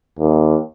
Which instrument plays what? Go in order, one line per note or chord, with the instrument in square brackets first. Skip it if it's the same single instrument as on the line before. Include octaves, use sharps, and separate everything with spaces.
[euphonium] D#2